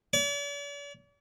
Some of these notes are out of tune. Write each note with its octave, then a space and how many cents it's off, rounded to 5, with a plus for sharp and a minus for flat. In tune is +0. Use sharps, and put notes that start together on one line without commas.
D5 -45